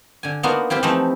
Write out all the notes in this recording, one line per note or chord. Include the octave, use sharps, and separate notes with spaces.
D3 G#5
A#3 B3 D4 D#4 F4 F#4
C4 E4 F4 G4
E3 F3 A3 C4 D#4 E4